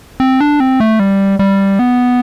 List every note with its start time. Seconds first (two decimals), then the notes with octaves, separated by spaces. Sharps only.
0.20 C4
0.40 D4
0.60 C4
0.80 A3
1.00 G3
1.39 G3
1.79 B3